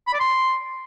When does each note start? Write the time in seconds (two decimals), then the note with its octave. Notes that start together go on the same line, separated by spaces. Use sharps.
0.07 B5
0.13 D5
0.20 C6